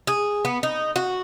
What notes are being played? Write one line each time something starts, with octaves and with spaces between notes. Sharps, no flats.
G#4
B3
D#4
F#4